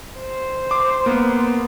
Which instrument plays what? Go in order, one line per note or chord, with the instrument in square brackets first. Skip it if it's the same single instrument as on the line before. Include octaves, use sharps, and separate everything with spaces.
[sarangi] C5
[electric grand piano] D6
A#3 B3